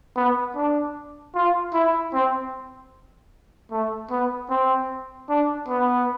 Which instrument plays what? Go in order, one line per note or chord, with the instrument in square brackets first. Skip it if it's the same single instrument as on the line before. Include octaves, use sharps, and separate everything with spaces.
[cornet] B3
D4
F4
E4
C4
A3
B3
C4
D4
B3